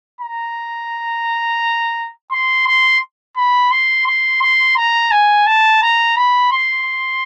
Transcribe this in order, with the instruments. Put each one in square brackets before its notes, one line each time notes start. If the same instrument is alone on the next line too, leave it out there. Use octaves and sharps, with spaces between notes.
[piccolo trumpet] A#5
C6
C6
B5
C6
C6
C6
A#5
G#5
A5
A#5
B5
C6